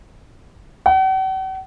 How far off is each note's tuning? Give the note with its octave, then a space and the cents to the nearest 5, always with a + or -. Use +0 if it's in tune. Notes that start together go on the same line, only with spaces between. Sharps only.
F#5 +45